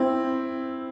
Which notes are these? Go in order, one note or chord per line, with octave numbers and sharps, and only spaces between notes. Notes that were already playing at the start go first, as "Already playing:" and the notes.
Already playing: C4 E4